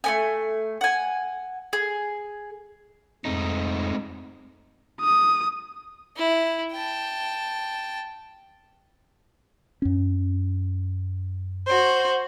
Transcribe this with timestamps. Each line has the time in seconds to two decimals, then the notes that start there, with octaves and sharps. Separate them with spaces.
0.04 A3 B3 G#5
0.81 F#5 G#5
1.73 G#4
3.25 F2 G#3 A3 D#4
5.01 D#6
6.16 E4
6.72 G5 A5
9.82 F#2 C#4
11.67 F#4 C5